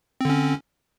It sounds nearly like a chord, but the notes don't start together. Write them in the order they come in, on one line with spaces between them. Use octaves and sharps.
C4 D3 C#4